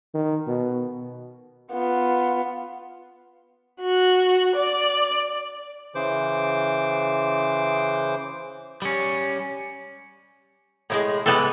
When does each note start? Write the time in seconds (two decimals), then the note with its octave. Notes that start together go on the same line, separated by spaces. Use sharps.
0.14 D#3
0.47 B2
1.72 B3 F4
3.78 F#4
4.53 D5
5.95 C#3 E3 C5 D6
8.82 G3 C#4
10.90 A2 E3 G#3
11.26 E3 G3 G#3 B3 A4